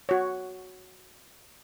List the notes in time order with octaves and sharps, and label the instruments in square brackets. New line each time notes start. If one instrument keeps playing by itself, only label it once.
[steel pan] F#4 C#5